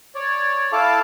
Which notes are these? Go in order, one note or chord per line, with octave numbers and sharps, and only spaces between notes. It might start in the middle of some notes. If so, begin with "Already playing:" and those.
C#5 D5
E4 A4 F5 A5 D6